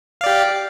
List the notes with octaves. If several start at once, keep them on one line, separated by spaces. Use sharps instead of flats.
G4 D5 F5